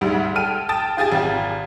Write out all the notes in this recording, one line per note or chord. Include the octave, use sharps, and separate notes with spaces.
D2 G#2 G3
A4 G5 F6 D#7
G5 A5 D#6 A6
F4 G4 G#4 G#5 A6
G#1 F4 G4